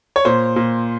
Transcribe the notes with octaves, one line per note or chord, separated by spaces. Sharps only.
C#5
A#2 C5
A#2